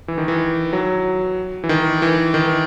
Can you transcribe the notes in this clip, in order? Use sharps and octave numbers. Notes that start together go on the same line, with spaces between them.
E3
D#3
E3
F#3
E3
D#3
E3
D#3